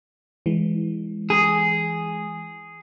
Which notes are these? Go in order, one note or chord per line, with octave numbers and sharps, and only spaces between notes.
E3 G#3
G#4